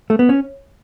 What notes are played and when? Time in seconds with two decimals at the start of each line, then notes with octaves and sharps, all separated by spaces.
0.10 A3
0.19 B3
0.29 C#4